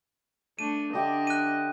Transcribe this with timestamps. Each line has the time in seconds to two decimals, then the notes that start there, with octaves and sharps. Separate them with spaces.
0.59 A3 D4 D#7
0.94 D3 D4 G4 D#5 E5
1.27 F#6 D#7